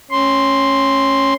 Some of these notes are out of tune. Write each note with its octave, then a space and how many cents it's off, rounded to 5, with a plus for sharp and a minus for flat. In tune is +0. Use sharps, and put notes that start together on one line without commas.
C#4 -10 C6 +0